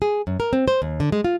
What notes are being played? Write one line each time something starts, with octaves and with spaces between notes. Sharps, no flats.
G#4
F#2
A#4
C4
C5
D#2
D3
G#3
F4